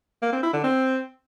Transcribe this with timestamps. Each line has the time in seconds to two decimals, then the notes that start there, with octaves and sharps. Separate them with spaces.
0.22 A#3
0.32 C4
0.43 E4
0.53 D3
0.64 C4